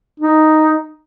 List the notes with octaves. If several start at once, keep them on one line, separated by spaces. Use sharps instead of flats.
D#4